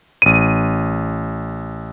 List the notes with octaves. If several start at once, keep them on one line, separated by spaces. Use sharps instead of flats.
A1 D#7